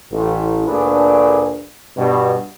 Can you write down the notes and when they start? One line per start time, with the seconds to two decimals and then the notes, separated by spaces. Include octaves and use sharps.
0.11 A1
0.67 D2 A#2 A3 D4 G#4 B4
1.97 G2 B2